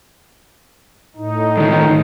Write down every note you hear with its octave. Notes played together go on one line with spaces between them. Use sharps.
A2 D#4
G2 D#3